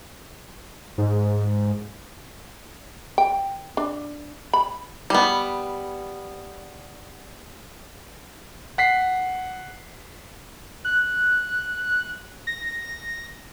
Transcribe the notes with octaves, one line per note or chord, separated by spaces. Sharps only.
G#2
G5
D4
B5
G3 B3
F#5 B6 C7
F#6
A#6